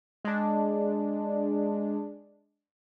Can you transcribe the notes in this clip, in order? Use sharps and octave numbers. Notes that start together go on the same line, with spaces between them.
G#3 D4